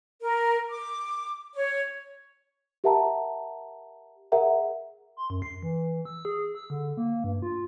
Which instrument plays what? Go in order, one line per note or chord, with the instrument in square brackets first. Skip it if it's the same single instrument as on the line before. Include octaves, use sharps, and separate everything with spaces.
[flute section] A#4
D6
C#5
[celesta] G4 A#4 E5 F#5 A5 A#5
G#4 A#4 E5 F#5 A#5
[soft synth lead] C6
F#2
C7
E3
E6
G#4
E6
D3
A#3
G2
F4